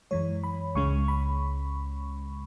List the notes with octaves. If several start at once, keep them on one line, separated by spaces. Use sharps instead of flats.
F#2 E3 G#3 C#5
B5
C#2 C#3 G#3 C#4 C#6
B5